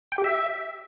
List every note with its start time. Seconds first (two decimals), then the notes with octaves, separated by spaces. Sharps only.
0.12 G5
0.18 G4
0.24 E5